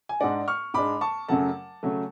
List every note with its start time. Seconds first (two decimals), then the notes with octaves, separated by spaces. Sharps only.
0.09 G#5
0.20 G#2 G#3 D4 D5 F#5
0.48 C#6 F6
0.74 G#2 G#3 D4 B5 D6
1.01 A5 C#6
1.29 F#2 C#3 F#3 A3 F#5 A5
1.83 C#3 F#3 A3